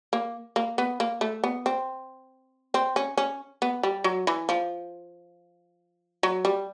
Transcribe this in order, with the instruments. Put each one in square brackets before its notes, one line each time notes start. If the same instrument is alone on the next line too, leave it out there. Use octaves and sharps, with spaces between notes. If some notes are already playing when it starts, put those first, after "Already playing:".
[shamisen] A#3
A#3
B3
A#3
A3
B3
C4
C4
C#4
C#4
B3
G3
F#3
E3
F3
F#3
G3